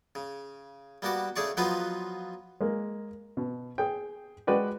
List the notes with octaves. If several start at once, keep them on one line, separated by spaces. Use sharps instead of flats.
C#3
G3 A#3 B3 F#4 D6
C#3 A3 G#4 D5 C#6
F3 F#3 B3 D#4 F4 B4
G#3 A#3
B2
G#4 G5
G#3 F#4 B4 D5 G5